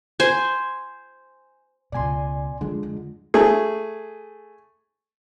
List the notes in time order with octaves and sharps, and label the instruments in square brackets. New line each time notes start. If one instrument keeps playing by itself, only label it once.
[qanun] C5 G#5
[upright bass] C#2 B2 [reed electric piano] D5 G#5 C6
[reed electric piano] D3 G#3 [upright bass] F3
[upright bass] F2
[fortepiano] A3 G#4